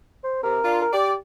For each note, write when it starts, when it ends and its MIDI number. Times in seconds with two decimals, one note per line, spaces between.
0.24 0.43 72
0.43 0.59 48
0.43 0.80 70
0.64 0.84 62
0.64 0.84 65
0.82 0.89 70
0.93 1.15 67
0.93 1.11 74